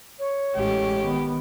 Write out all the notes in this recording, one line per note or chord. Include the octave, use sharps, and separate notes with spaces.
C#5
A1 G#3 G4
D#3 B3